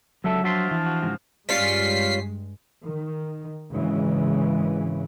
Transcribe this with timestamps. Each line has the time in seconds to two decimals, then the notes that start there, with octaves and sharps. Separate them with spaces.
0.24 C#2 D3 F#3 A4 E5
0.44 F3 D4 F4 F#4 E5 C6
0.71 E3
0.86 F#4
1.02 C#2 G#2 F#4
1.49 G2 G3 G#3 C#4 F4 B6 C7
2.82 D#3
3.74 G#1 C#3 E3 G#3